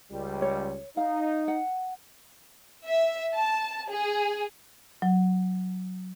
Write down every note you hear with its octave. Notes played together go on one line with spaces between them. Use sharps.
C#2 G3
C#5
D#4 F5
F#5
E5
A5
G#4
F#3